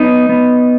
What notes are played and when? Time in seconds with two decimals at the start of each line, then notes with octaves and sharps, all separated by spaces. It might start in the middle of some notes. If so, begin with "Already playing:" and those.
Already playing: B3 D#4
0.29 B3